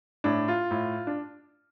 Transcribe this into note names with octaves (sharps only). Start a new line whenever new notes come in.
A2 D4
F4
A2
D4